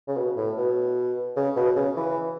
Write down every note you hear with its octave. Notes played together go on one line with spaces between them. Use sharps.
C#3
B2
A2
B2
C#3
B2
C#3
E3